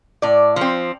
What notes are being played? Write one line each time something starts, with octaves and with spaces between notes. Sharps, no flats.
A2 D5
F3 C4